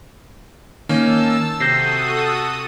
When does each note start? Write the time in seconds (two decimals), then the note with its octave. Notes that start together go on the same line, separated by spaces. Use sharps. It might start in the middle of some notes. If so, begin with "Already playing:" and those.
0.89 D#3 A#3 C#4 D#4 A5 E6
1.60 C3 F#4 A4 D#6 G6 A#6 C7